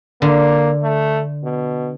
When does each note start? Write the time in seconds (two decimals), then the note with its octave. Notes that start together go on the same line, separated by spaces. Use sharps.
0.22 D3 A#3
0.83 A3
1.44 B2